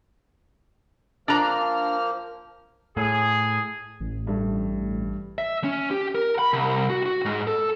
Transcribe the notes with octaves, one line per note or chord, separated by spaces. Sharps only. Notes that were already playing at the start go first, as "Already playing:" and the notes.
F3 A#3 D4 A#5 F6
A2 G#4
A1
G2 A3
E5
C#4
G4
A#4
B5
C2
F#4
F#4
G#2
A4